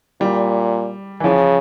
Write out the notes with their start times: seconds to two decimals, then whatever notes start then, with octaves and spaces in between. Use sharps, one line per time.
0.21 A#2 G3
1.20 E3
1.24 C#3 F3